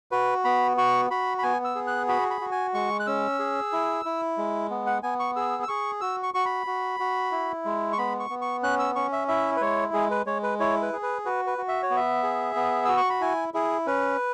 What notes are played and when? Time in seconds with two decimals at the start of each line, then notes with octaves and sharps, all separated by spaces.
0.11 F#4 B4
0.44 B3 B5
0.77 F#4 C#6
1.10 F#4 B5
1.39 B5
1.43 B3 G#5
1.64 E6
1.75 G#4
1.87 F#6
2.08 F#4 B5
2.30 B5
2.41 F#4
2.52 G#5
2.74 G#3 C#6
3.00 F#6
3.07 C#4 E6
3.39 G#4
3.72 E4
4.05 E4
4.38 G#3
4.70 B3
4.87 F#5
5.03 B3 G#5
5.19 C#6
5.36 G#4 E6
5.63 E6
5.68 G#4 C#6
6.01 F#4 E6
6.23 C#6
6.34 F#4 C#6
6.45 B5
6.67 F#4
7.00 F#4
7.32 E4
7.65 G#3
7.93 C#6
7.98 B3 B5
8.20 C#6
8.30 B3
8.41 C#6
8.62 C#4 F#6
8.79 E6
8.95 C#4 C#6
9.12 E5
9.28 E4 E5
9.57 B4
9.61 G#3 C#5
9.93 G#3 G#4
10.11 B4
10.26 G#3 C#5
10.43 B4
10.60 E4 C#5
10.82 B4
10.93 G#4
11.03 B4
11.25 F#4 B4
11.47 B4
11.58 F#4
11.68 E5
11.83 C#5
11.90 B3
11.96 E5
12.23 G#4
12.56 B3
12.85 F#4 E6
12.97 C#6
13.10 B5
13.21 E4 G#5
13.54 E4 G#4
13.86 C#4 B4